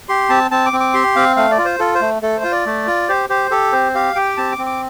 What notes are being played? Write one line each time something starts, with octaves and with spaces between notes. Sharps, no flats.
G4 C6
C4 A5
C4 A5
D6
C4
D6
G4 C6
C4 F5
A3 F5
D5
F4
C5
F4 A4
C5
A3
A3 A4
C5
F4
D5
A3
F4
G4 C5
G4 C5
G4 A4
C4 C5
G4 F5
G4 G5
C4 A5
D6
C4
D6